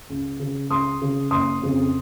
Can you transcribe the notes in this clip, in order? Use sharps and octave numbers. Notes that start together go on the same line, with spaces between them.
C#2
C#3
C#2 C6 D#6
C#3
F#1 C6 D#6
F2 C#3